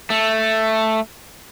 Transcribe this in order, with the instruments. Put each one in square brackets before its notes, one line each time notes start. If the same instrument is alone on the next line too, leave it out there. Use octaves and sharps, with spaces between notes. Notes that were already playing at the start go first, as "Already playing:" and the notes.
[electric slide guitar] A3